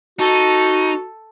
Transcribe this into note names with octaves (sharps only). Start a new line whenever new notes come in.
D#4 F#4 A4